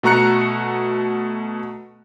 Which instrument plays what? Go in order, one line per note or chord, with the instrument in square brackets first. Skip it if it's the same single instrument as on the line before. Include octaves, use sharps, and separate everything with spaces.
[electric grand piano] B2 A3 F#4 A#5 F#6 C#7